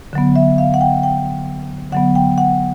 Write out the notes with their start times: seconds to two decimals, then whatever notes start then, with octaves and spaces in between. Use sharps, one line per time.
0.13 D3 F#3 B3
0.36 E5
0.58 F5
0.74 F#5
0.81 G5
1.03 G5
1.92 D3 F#3 B3 F#5
2.15 G5
2.38 F#5